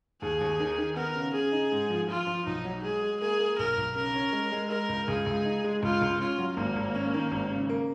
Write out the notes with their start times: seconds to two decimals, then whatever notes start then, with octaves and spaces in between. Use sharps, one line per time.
0.22 D#2 G#4
0.41 D#2
0.60 D#3
0.78 D#3
0.96 B3 A#4
1.15 C#3
1.34 C#3 G#4
1.52 D#4
1.72 G#2
1.90 F3
2.09 F3 F4
2.27 F3
2.46 B1 D#4
2.65 F#3
2.83 G#3 G#4
3.03 G#3
3.20 A#3 G#4
3.40 A#3
3.58 B1 A#4
3.78 B1
3.95 C#3 A#4
4.14 C#4
4.33 G#3
4.52 G#3
4.70 G#3 A#4
4.89 C#2
5.08 C#2 G#4
5.26 C#2
5.45 D#4
5.64 G#3
5.83 C#2 F4
6.02 C#2
6.20 C#4 F4
6.39 F#3
6.57 G#1 A#3
6.76 G#1
6.95 C#4
7.14 D#3
7.32 G#1
7.50 C#3
7.69 A#3